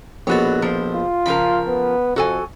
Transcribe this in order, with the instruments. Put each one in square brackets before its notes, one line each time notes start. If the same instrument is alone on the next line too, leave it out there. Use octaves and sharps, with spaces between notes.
[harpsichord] A#1 B2 A4 [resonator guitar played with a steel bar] F#4 C#5
[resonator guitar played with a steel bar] F3 C5
[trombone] F4
[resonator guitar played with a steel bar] C#3 F3 A#4 [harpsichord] B5
[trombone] B3
[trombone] F2 [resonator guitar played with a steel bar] F#4 A4 G#5